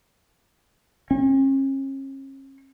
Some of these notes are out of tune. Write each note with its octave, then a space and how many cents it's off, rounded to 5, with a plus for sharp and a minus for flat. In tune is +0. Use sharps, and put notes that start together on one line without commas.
C#4 -40